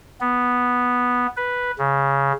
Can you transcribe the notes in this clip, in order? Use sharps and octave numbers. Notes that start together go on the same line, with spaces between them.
B3
B4
C#3